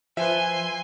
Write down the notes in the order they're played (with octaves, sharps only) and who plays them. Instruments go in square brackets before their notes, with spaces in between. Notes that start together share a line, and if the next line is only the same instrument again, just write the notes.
[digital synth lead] F3 [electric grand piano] B4 E5 [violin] G#5 C6